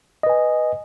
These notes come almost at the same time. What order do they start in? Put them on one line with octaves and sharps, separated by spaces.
D#5 B4 G#5